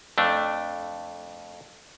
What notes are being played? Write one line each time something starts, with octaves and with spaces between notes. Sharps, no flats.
F2 A3 D4